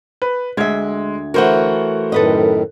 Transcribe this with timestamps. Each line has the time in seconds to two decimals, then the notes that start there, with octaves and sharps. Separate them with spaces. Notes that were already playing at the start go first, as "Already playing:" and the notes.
0.22 B4
0.57 D2 G#3 E5 G#6
1.34 E3 A3 F#4 A#4 C5 F#5
2.12 F#2 A2 D#3 A4 B4 D#5